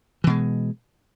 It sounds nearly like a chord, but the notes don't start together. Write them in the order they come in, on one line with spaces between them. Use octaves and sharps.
E3 B2 G#3